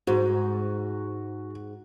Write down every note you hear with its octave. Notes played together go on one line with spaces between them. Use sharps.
G#2 F#4